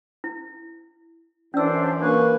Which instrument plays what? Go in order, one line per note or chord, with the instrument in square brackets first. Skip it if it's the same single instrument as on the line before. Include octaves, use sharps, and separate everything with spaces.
[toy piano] E4
[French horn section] F#2 E3 [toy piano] C#4 E6 [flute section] D4 C5 D5
[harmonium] A#3 B4 [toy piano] D4 [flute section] C#6 F#6